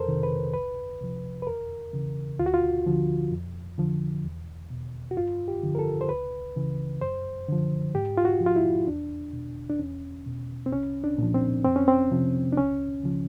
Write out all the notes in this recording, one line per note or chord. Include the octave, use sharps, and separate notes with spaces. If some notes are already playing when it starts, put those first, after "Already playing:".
Already playing: F2 A4 A#4 C5
C3 D#3
B4
C2 B4
C3 F3
B4
E2 A#4
C#3 E3
D2 F4
F#4
F4
D3 F3
F2
D3 F3
E2
B2
F#4
G2 F4
G4
D3 F3
A#4
A4
C5
C#2 B4
C#3 E3
F#2 C5
D3 F3
G#2 G4
F4
F#4
F3
F4
E4
E2 D4
B2
D4
E2 C#4
B2
C4
C2 C#4
D4
A#2 F3
C4
F2 C4
C#4
C4
C3 F3
D4
C#2 C#4
C#3 F3